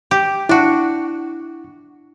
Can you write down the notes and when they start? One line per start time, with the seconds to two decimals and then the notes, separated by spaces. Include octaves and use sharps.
0.11 G4
0.49 D4 E4 F#4